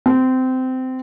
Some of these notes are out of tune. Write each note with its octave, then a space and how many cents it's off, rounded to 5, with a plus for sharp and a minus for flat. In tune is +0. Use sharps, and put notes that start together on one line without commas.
C4 -20